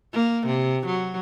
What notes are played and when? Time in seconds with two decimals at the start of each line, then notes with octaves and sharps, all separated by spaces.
0.13 A#3
0.47 C3
0.86 F#3